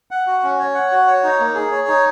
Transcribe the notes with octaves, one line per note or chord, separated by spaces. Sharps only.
F#5
F#4
C#4
C#5
F#5
F#4
C#5
D#4
A#3
G#4
C#5
D#4